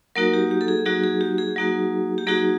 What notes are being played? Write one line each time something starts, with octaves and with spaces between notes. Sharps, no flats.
F#3 A#3 D#4 F#4 A#4
G4
G4
A4
G#4
F#3 A#3 D#4 F#4 G#4
G#4
G4
G#4
F#3 A#3 D#4 F#4
G4
F#3 A#3 D#4 F#4 G#4